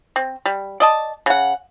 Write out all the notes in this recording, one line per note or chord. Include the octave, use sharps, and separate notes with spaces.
C4
G3
D5 D#5 A5
C#3 F#5